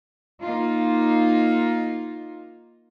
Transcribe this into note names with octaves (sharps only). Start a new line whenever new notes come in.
A#3 D#4 F4